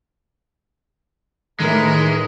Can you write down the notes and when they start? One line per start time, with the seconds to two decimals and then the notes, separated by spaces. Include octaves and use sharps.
1.60 A2 D#3 E3 G#3 A3 A#4